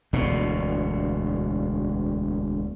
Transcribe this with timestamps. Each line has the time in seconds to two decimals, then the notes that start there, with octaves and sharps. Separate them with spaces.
0.13 E1 D2 B2